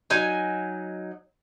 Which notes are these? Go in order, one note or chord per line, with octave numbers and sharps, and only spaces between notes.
F#3 D#4 G#5